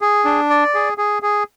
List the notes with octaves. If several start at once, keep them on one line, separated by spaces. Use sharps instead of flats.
G#4
D4
D5
G#4
G#4
G#4